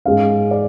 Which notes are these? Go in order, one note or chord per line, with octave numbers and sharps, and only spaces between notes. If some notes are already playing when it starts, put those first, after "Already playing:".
G#2 G#3 C#4 F5
D5